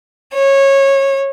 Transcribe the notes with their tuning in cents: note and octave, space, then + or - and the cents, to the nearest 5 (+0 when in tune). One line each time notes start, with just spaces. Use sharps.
C#5 -20